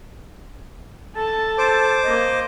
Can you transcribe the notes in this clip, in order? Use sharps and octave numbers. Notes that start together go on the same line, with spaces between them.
A4 A5
C5 D6
A#3 D#5